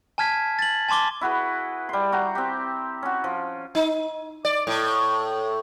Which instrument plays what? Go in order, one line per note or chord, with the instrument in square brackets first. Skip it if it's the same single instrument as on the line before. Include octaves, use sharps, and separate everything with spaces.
[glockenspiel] G#5 A5 F6 G#6 B6
A6 F#7
G#5 A5 C6 D6 G7
[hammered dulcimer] E4 F#4 G#4 B4
G3 C6
F#4 G5 A#5
C4 G4
C#4 F#4
F3
[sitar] D#4
D5
A2